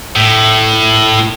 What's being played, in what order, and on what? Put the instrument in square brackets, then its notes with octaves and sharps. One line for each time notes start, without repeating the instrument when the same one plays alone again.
[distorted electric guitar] A2